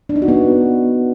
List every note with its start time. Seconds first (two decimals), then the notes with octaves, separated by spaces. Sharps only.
0.09 D4
0.16 D#4
0.22 F#4
0.28 B3